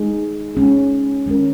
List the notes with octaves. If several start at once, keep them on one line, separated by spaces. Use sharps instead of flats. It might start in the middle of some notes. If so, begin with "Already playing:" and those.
Already playing: G#3 D#4 G#4
G#3 C#4 G#4
D#3 G#3 C#4 A#4